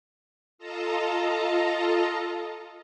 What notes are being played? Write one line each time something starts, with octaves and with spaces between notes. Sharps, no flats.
F4 A4 D#5 A5 A#5